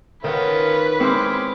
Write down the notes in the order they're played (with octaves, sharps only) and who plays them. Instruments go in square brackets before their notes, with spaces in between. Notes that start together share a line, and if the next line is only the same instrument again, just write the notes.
[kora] D#3 F#5 [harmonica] C#4 F4 A#4 [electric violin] B4
[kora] G#3 E4 [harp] C4 [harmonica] C#5 D6 F6